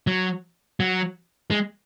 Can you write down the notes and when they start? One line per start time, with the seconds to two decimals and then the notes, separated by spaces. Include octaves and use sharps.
0.07 F#3
0.80 F#3
1.51 G#3